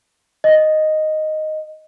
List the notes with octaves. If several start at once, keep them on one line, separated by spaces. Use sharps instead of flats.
D#5